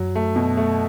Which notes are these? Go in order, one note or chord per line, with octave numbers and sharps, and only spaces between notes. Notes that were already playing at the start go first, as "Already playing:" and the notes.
Already playing: F#2 F#3
A3
B2
A3